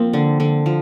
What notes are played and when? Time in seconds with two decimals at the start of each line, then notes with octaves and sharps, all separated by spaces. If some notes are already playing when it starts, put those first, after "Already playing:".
Already playing: F3 A#3 C4
0.13 D3
0.40 D3
0.66 F3